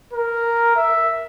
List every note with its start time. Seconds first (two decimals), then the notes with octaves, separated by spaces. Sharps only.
0.13 A#4
0.76 E5